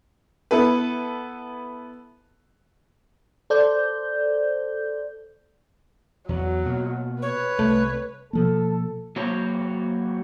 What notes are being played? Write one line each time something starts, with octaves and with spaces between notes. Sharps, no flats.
B3 E4 A4 B4
A4 C5 D5 G6
E2 F#3
B2 A#3
B4 C#5
C2 A3
B2 F3 A#3 A4
F#3 A#3 F#4 C5 C#5